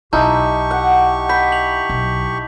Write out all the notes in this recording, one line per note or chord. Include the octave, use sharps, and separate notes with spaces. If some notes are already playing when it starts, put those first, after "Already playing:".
B1 D#4 E4 G4 A5 C#6 F6 G6
F#5
B5 G6 B6
F7 F#7
B1